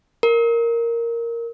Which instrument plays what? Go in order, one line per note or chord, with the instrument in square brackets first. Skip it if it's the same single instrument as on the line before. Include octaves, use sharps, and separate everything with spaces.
[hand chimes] A#4